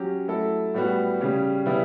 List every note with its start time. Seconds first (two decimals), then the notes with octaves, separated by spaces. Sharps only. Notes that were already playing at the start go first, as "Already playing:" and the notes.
Already playing: F#3 C#4 G4
0.28 F#3 A3 E4 A4
0.74 A2 G3 B3 F#4
1.21 C#3 G3 C#4 G4
1.66 C#3 G3 B3 E4